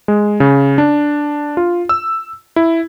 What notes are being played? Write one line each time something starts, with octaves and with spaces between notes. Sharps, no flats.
G#3
C#3
D4
F4
E6
E4